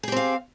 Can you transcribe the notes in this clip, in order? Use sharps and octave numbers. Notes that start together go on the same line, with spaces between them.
C4 G4 G#4 F5